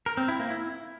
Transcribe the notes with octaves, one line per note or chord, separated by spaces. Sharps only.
A#4
C4
E4
A#3
E4